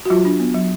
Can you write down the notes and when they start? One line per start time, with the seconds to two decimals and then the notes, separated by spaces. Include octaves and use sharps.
0.05 F#4
0.10 F#3 F4
0.25 D4
0.40 B3
0.54 F#3